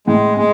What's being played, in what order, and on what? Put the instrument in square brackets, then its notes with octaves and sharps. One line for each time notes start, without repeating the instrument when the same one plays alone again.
[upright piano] A2 [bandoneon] G#3
[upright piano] A2 [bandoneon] G#3